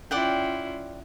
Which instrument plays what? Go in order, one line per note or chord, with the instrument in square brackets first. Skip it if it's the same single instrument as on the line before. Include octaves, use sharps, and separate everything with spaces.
[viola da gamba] C#4 E4 F4 [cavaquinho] D5 F#5 G5